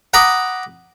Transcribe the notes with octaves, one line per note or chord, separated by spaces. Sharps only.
F#5 A#5 B5 D6 D#6